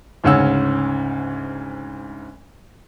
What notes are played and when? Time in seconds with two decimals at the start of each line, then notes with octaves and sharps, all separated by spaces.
0.24 D2 G#2 C#3 C#4 F#5 E6